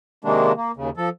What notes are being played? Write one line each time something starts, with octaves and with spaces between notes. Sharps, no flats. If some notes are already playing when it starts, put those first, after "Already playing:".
C3 D#3 G#3 A#3 D4
A#3
D#2 C#3
F3 A4